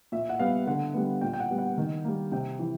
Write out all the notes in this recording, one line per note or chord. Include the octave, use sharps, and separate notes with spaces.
A#2 E5
F#5
G3 B3 F5
D3 F#5
G3 B3
A#2 G5
G5
F#5
G3 B3
F#5
D#3
G3 A#3
C3 G5
E3